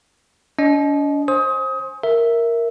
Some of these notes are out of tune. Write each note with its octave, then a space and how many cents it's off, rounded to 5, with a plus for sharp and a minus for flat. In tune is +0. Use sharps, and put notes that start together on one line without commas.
D4 -45 D#5 +0
C5 +25 G#5 +0 D#6 +25
A#4 +0 E5 +0